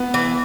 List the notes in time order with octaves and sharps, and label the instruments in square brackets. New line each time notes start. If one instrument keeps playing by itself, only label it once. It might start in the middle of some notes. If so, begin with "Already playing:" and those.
Already playing: [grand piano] B3
[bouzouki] E3